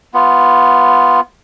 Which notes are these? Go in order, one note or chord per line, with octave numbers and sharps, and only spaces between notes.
B3 F4